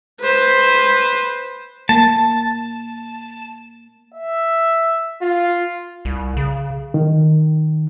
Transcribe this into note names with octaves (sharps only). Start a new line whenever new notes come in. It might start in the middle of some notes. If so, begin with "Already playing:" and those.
B4 C5
A#3 A5
E5
F4
C2
C#3
D#3